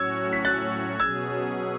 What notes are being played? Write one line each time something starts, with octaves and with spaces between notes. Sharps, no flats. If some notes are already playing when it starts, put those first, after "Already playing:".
Already playing: A2 F#3 C#4 F#4 C#5 E6 G#6
B6
F#6 A6
B2 F#3 C#4 G#4 E6 G#6